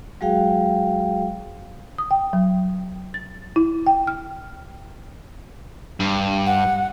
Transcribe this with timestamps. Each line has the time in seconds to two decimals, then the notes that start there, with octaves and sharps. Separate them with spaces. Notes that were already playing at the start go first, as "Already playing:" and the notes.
0.21 F#3 G#3 F#4 G#4 F5 G5
1.98 D#6
2.11 G5
2.33 F#3
3.14 A6
3.56 E4
3.87 G5
4.07 F6
6.00 G2
6.46 F#5